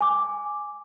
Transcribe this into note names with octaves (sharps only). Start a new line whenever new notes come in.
G#5 D6